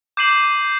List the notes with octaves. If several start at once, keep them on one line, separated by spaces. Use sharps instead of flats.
D6 G6 C7 D#7 F#7